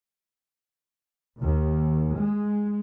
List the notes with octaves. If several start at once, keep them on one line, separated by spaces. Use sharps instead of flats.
D#2
G#3